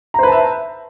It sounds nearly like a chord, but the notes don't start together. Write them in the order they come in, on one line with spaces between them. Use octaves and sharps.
A#5 C5 B4 A5 E5